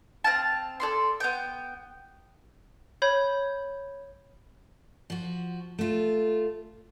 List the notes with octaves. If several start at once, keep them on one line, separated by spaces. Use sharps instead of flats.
C4 F5 A5
A4 D5 C6
B3 G5
C#5 B5 G6
F3 F#4
A3 F4